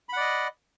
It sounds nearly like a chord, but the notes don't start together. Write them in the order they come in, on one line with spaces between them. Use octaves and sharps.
B5 F#5 D5 D#5